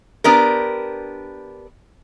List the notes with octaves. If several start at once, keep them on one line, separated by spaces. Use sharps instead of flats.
B3 D4 G4 A#4